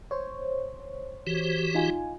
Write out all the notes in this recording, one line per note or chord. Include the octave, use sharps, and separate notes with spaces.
C5 C#5
E3 F#4 G4
D#4 F4 G#5